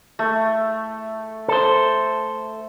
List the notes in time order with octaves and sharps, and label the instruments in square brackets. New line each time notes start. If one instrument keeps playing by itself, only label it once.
[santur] A3
[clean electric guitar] A4 C5